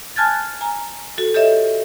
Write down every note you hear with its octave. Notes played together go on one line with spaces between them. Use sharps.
G#5 A5 F6 F#6 G#6 A6
G#5 A#5
F#4 A4
G4 A4 C#5 D#5 E5